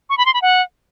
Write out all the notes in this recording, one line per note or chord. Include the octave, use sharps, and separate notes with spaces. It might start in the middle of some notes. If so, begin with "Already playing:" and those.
C#6
B5
C6
B5
F#5